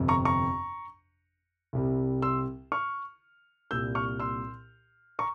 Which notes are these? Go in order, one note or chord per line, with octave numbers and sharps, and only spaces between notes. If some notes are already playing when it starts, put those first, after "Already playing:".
Already playing: G1 F2 C3
A#5 C#6
A#5 C#6
C2 C3 G3
C6 E6
C#6 F6
C2 A#2 G3 E6 G6
C#6 F6
C6 E6
A#5 C#6